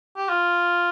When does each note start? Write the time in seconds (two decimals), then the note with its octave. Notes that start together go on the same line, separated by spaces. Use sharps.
0.17 G4
0.29 F4